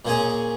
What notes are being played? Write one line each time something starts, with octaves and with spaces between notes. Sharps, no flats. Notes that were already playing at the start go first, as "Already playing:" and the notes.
A#2 A#3 C#4 G#4